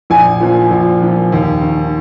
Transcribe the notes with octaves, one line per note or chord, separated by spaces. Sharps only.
A#1 G#5
A#2 F3
A#1
A#2 F3
D#2
D#3